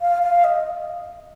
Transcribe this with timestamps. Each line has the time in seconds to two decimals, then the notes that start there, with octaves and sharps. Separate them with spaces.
0.01 F5
0.23 F5
0.44 D#5